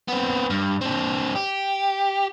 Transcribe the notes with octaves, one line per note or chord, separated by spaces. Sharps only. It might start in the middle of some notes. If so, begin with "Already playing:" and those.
B3 C4
G2
C4 D4
G4